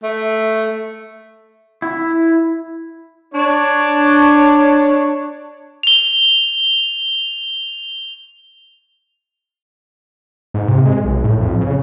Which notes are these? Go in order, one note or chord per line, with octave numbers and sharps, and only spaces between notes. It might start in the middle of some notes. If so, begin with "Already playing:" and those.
A3
E4
D4 C#5
F7 G7
G#2
C3
G#3
B1
A2
F2
C#3